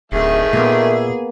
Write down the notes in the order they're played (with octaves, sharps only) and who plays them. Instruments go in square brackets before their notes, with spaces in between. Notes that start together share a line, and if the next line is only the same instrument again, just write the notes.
[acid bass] D1 [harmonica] D#3 A3 E5 [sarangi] G#4
[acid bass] A#2 [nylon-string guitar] A#3 B3